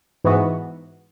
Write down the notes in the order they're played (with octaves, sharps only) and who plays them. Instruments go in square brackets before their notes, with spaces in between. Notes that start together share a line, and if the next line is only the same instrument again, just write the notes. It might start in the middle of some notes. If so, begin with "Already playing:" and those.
[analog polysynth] G#2 E3 B3 F#4